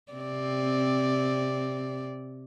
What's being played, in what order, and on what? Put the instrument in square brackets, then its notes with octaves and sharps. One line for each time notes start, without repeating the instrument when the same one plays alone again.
[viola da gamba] C3 C4 D5